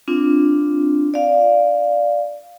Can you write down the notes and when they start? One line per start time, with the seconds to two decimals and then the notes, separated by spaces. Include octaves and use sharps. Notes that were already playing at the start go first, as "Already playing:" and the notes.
0.08 C4 D4 F4
1.14 D5 F5